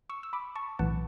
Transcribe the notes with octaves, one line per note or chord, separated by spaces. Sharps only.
C#6 E6
E6
B5 D6
A5 C#6
B1 A2 E3 F#5 A5